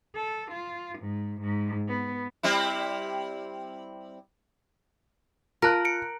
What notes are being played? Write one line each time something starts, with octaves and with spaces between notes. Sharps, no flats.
A4
F4
G#2
G#2
B3
G3 C4 E4
F4 A#4 A5 A#5 F#6
C#7 D7